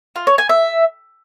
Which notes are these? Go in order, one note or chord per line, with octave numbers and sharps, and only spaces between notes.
F4
C#5
G#5
E5